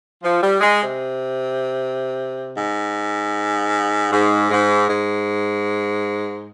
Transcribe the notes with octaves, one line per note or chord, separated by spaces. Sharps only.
F3
G3
G#3
C3
G#2
G#2
G#2
G#2